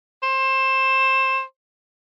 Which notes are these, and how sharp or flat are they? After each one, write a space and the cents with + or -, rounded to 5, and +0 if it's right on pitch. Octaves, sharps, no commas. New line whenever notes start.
C5 +20